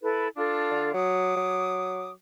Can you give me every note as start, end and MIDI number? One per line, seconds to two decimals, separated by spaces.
0.02 0.27 64
0.02 0.27 69
0.02 0.27 71
0.36 0.92 62
0.36 0.92 65
0.36 0.92 69
0.71 0.91 50
0.93 1.34 54
0.93 2.10 86
0.93 2.10 87
1.36 2.11 54